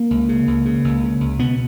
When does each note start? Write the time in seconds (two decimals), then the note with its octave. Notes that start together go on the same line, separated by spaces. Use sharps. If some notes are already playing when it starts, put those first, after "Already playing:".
Already playing: A#3
0.11 C#2
0.29 C#3
0.47 C#2
0.65 C#3
0.84 C#2
1.03 C#3
1.21 C#2
1.39 B2 B3